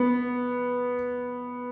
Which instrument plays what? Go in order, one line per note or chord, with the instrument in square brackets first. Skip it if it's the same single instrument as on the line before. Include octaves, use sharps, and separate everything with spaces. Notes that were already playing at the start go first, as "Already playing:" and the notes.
Already playing: [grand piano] B3